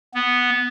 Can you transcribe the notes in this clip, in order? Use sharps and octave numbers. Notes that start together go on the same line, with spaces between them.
B3